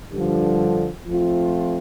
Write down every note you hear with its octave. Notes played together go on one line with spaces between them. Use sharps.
G2 D3 F3
F3 A3 C4 F4